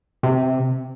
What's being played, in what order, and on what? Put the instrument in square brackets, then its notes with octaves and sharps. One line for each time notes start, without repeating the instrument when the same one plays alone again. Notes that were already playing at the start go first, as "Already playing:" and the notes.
[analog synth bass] C3